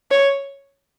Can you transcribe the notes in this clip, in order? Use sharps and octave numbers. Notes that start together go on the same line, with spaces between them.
C#5